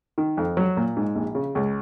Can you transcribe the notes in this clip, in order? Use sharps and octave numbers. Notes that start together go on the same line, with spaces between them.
D#3
F2
F#3
A#2
G#2
A#1
C#3
C#2